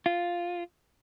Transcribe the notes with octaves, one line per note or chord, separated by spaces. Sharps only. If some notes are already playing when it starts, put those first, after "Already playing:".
F4